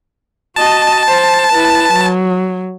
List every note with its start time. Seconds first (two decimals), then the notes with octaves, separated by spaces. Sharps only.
0.56 F#4 D#5 A5
1.07 C5
1.53 E4 B4
1.93 F#3